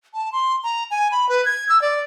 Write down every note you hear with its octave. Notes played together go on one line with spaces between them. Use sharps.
A5
C6
A#5
G#5
B5
B4
G#6
E6
D5